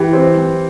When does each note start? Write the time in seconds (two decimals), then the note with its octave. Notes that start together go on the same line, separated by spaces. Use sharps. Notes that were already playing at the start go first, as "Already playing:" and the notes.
Already playing: E3 G4
0.13 C4
0.37 E3